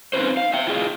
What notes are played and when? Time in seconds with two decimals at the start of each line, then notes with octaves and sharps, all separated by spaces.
0.13 C4 C#4 D#4 F4 B4 C5
0.37 F5
0.53 E5 G5
0.67 E4 F4 G#4 D#5